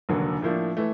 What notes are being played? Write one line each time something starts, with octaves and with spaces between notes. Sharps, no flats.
F1 D#2 D3 F#3 A#3
A2 F3 A#3 D4
E3 A3